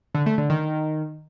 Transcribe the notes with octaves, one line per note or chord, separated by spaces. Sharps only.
D3
A3
D3
D#3